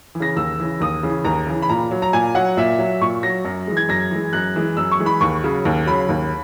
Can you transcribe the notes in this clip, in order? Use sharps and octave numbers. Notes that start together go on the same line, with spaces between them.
E3
C#3 A#6
D#2 E6
C#3 E3
D#2 D#6
C#3 E3
D#2 A#5
C#3 E3
B5
A#2 A#5
F#3
A#5
A#2 G#5
F#3 F#5
A#2 E5
F#3
A#2 C#6
F#3 A#6
F#2
E3 G#3
G#6
F#2 A#6
E3 G#3
F#2 F#6
E3 G#3
F#2 E6
C#6
E3 G#3
B5
D#2 C#6
C#3 F#3
D#2
C#3 F#3 B5
D#2